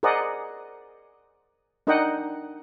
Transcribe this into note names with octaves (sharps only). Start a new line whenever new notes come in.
G#4 A#4 C5 D5 D#5 F#5
D4 D#4 A#4 D#5 F#5 G5